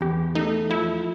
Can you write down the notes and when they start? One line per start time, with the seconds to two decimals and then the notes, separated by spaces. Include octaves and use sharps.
0.01 E2 G4
0.35 A3 D#4
0.70 F3 E4